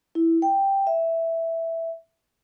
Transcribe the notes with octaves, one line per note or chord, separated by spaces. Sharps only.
E4
G5
E5